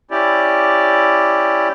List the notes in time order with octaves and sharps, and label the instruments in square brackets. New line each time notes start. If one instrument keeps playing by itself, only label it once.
[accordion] C#4 E4 G4 D5